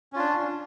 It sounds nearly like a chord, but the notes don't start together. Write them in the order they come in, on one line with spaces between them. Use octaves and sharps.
C#4 F4 D4